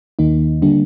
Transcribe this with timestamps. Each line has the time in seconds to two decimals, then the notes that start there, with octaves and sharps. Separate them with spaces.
0.19 D#2 D#3 A#3 D#4
0.62 D3 G3 A#3 D4